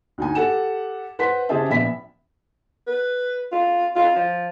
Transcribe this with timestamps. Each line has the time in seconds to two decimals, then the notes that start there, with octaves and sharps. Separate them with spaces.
0.18 D2 D#4 G#5
0.35 G4 A4 F#5 E7
1.19 B4 C5 F#5 C6 B6
1.49 C#3 G4 G#4 C5 E5 A5
1.69 A#1 B3 E5 B5 B6
2.87 B4
3.52 F4
3.96 F4
4.16 F3